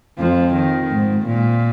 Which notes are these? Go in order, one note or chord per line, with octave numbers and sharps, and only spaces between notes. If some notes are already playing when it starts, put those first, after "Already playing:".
F2 F3
D#3
G#2
A#2